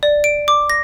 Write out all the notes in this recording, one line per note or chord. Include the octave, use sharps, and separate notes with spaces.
D5
D7
D6
A#6